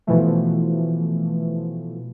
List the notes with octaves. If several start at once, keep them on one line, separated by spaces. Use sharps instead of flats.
B2 E3 F3 A3